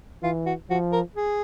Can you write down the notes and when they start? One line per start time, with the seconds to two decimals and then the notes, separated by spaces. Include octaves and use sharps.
0.23 E3 F4
0.46 F#4
0.70 F3 F#4
0.92 A#4
1.16 G#4